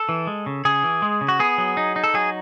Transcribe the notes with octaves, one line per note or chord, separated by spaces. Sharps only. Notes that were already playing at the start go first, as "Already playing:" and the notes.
Already playing: A4
E3
G#3
C#3
C#3 G#4
E3
G#3
C#3
F#4
B3 G#4
F#3
D#4
D#4
A4
F#3 G#4